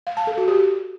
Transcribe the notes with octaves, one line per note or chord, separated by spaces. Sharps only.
F5
A5
A4
F#4
G4